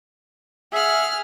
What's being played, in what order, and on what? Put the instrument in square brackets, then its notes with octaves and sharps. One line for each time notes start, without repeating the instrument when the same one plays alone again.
[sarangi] G#4 [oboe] E5 [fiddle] F#5 F6